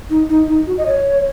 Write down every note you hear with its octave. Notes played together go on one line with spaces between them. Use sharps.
D#4
D#4
D#4
F#4
D#5
C#5